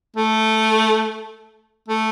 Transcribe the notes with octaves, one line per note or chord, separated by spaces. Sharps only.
A3
A3